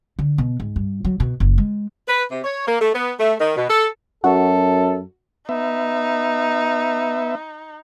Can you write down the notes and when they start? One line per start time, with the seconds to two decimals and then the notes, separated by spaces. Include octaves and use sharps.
0.19 D3
0.38 B2
0.60 G#2
0.76 G2
1.05 F#3
1.20 B2
1.40 F#1
1.58 G#3
2.08 B4
2.31 C3
2.44 C#5
2.68 A#3
2.81 A3
2.94 B3
3.20 A3
3.40 D#3
3.57 B2
3.70 A4
4.24 F#2 F#4 A4
5.49 B3 D#4 E5